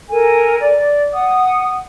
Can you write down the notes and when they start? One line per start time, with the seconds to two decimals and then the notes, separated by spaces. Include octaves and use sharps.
0.10 A4 A#4 G#5
0.61 D5
1.13 F#5 D#6